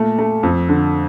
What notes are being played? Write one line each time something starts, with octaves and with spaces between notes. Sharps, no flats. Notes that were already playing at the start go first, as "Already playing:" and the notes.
Already playing: A#2 A3
A3
F2
D3